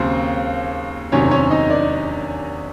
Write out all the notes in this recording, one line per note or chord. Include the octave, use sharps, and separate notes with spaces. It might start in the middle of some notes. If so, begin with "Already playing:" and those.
Already playing: D#2 C#3 F#3 C4 C5
E2 C3 D#3 F#3 C#4 C#5
C#4 C#5
D#4 D#5
D4 D5